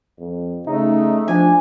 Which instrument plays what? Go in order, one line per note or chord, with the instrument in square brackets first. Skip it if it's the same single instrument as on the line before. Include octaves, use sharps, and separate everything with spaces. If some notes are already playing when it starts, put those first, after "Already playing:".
[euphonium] F2
[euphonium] C#3 [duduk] A3 [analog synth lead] D#4
[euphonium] F3 [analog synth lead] D4 [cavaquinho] G#5